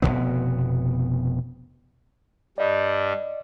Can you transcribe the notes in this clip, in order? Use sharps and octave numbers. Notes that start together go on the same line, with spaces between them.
F1 E2 B2 B3
G2 G3 D5 D#5